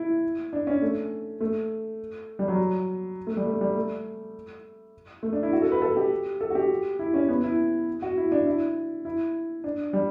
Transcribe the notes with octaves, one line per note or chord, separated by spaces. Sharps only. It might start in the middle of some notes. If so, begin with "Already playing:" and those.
Already playing: E4
D4
C#4
A3
A3
G3
F#3
A3
G3
A3
G3
A3
A3
D4
E4
F#4
A4
B4
A4
G4
A4
F#4
G4
E4
C#4
B3
E4
F#4
E4
D4
E4
E4
D4
G3